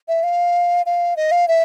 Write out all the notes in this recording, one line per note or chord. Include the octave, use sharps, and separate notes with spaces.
E5
F5
F5
D#5
F5
E5